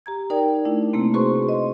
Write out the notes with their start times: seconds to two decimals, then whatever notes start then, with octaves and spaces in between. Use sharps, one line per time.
0.06 G4 A#5 G#6
0.30 D#4 A#4 D5 G5
0.65 A3 D4 E4
0.93 C3 A3 A#3 C4
1.14 F#4 G#4 B4 C5 C6 C#6
1.49 D#5 C6